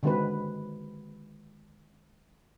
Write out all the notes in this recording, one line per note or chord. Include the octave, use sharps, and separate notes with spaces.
D3 D#3 G#3 C4 F#4 B4